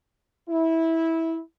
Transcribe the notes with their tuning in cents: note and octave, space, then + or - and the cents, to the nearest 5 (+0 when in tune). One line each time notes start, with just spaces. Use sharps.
E4 -15